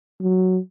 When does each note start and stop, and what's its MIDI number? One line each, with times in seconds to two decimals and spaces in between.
0.21 0.58 54